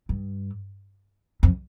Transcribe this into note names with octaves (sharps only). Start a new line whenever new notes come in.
G2
F2